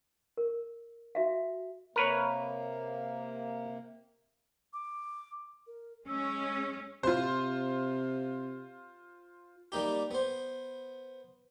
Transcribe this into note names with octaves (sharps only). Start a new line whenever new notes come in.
A#4
F#4 E5 F5
C3 A#3 A#4 B4 C#5
D6
A#4
G#3 C#4 E6
C3 F4 C5
G3 A#3 D#4 G4
B3 C5